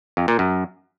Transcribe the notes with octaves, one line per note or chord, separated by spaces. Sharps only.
F2
A#2
F#2